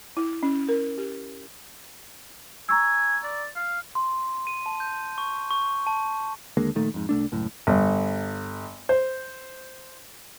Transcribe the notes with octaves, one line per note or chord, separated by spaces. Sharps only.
E4
C#4
A#4
G4
G#5 A#5 C#6 E6
D5
F5
C6
D#7
A5
G6
C#6
C#6
A5
D#2 D3 G#3 A#3
A#1 A#2 D#3 A3
F2 G#2
C2 A3 D4
C#2 F#2 A2
G1
C5